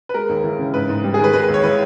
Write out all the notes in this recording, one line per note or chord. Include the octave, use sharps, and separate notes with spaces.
B4
G#3 A#4
D#2
E3
C#3
G#2 B4
G#2
G3
G#4
D#3 B4
G#3 B4
B4
D#2
C#5
E3 B4